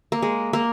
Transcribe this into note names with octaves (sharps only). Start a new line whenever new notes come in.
A#3
G#3
A#3